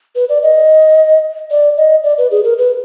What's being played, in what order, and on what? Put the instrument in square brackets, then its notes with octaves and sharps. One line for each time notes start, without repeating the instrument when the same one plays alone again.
[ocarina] B4
D5
D#5
D5
D#5
D5
B4
G#4
A#4
B4